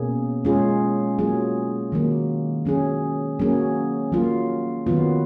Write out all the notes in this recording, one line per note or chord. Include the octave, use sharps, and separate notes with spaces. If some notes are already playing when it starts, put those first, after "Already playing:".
Already playing: B2 A#3 C#4 G#4
G#3 C#4 F4 G#4
F#3 A#3 F4 G#4
D#3 F#3 A#3
F#3 C#4 G#4
F#3 A#3 C#4 G#4
F#3 A#3 F4
D#3 F#3 B3 F4